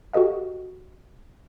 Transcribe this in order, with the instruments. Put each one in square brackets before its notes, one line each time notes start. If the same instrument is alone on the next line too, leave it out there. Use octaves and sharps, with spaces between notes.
[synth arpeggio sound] F#4 G4 A4 D#5 F5